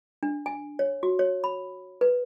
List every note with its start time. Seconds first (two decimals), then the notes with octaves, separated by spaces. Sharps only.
0.23 D4
0.46 G#5
0.79 C#5
1.03 F#4
1.19 C#5
1.44 B5
2.01 B4